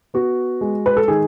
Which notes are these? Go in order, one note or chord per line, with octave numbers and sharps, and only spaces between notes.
B3 F#4
G#3
B4
A4
D#3 G#4